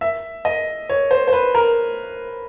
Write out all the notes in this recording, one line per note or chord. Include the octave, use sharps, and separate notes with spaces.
E5
D#5
C#5
C5
C5
B4
A#4